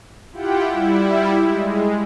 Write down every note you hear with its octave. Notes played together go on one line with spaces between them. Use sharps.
E4 F4 G4 F#5 G5
G3 E4
G#3